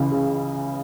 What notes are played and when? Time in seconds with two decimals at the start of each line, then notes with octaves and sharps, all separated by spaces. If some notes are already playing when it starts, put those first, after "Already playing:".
Already playing: C#2 C#3 E3
0.12 C#3